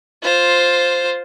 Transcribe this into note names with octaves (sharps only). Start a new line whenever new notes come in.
F4 C5